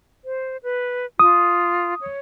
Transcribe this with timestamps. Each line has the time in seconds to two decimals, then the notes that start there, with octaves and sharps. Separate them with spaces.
0.25 C5
0.63 B4
1.19 F4 D#6
2.01 C#5